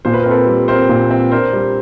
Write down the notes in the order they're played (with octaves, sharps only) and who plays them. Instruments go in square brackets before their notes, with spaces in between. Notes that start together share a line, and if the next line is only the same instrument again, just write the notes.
[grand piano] A#2 C5
B4
A#4
C4 A4 B4
G3
C4 A#4 C5
A#2
C4
D4 A#4 C5
G3